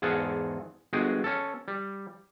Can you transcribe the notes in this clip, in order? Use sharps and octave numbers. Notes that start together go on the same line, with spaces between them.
E2 G#2 G#4 A4 F5 F#5
G1 G#3 F#4 G#4 G5 G#5
C#4 A4
G3